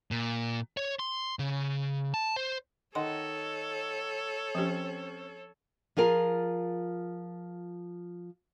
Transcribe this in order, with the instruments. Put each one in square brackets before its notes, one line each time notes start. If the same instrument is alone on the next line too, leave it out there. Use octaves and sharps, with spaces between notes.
[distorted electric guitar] A#2
C#5
C6
C#3
A5
C5
[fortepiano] D#3 D#5 F#5 [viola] A4 C#5 [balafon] C6
[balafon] F3 G4 [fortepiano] C4 C#4
[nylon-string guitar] F3 F4 G#4 A#4